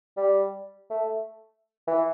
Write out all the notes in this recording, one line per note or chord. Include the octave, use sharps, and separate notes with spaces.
G3
A3
E3